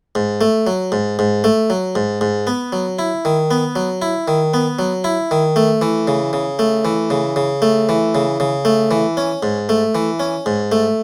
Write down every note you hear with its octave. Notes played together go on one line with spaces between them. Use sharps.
G#2
A3
F#3
G#2
G#2
A3
F#3
G#2
G#2
B3
F#3
E4
D#3
B3
F#3
E4
D#3
B3
F#3
E4
D#3
A3
E3
C#3
C#3
A3
E3
C#3
C#3
A3
E3
C#3
C#3
A3
E3
C#4
G#2
A3
E3
C#4
G#2
A3